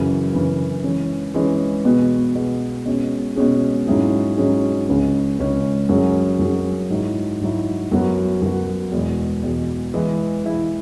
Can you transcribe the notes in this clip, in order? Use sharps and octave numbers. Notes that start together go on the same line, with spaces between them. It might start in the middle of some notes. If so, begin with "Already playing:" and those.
Already playing: F#2 C#3 E3
F#2 C#3 E3
E3 G#3 C#4
E3 G#3 C#4
B2 B3 G#4
B2 B3 G#4
B2 G#3 C#4 G#4
B2 G#3 C#4 G#4
G#2 F#3 C#4 E4 G#4
G#2 F#3 C#4 E4 G#4
C#2 C#3 G#3 C#4
C#2 C#3 G#3 C#4
F#2 F#3 C#4 G#4
F#2 F#3 C#4 G#4
G#2 F#3 E4
G#2 F#3 E4
F#2 F#3 B3 F#4
F#2 F#3 B3 F#4
E2 B2 G#3
E2 B2 G#3
E3 G#3 E4
E3 G#3 E4